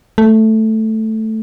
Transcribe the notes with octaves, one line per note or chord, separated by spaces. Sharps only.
A3